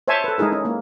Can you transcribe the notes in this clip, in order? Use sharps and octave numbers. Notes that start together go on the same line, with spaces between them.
C5 C#5 E5 G#5 A5
A4 B4
G#3 D#4 E4 G#4 A#4
C#4
A#3